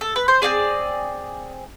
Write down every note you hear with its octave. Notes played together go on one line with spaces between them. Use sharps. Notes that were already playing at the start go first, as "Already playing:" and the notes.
A4
B4
C5
C4 F4 G#4 D5